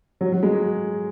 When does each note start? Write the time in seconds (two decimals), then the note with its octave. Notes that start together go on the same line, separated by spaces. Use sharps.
0.21 F#3
0.32 F#3
0.43 G#3